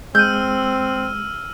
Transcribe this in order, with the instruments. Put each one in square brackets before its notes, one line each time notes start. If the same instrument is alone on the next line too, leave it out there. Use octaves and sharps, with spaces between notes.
[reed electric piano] G#3 [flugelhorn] C4 [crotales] E6 F6 D#7 [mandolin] G6